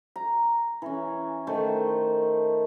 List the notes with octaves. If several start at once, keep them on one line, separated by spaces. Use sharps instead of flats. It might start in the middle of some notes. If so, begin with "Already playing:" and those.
A#5
E3 C#4
D#3 A3 D#4 C5